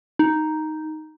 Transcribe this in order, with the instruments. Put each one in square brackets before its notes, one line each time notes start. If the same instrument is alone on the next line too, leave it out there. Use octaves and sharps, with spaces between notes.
[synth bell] D#4